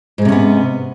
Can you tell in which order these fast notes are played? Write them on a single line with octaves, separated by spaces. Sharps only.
G#2 G#3 C3 C#4 B3